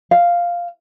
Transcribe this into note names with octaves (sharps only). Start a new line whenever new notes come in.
F5